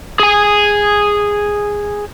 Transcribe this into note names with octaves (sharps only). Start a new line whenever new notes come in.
G#4 G#5